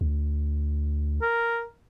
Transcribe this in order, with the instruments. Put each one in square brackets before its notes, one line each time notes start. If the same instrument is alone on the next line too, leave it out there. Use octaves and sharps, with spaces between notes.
[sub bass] D2
[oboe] A#4